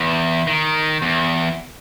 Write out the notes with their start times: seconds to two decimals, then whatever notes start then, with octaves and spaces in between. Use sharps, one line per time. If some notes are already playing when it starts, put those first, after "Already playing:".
Already playing: E2
0.47 D#3
1.02 E2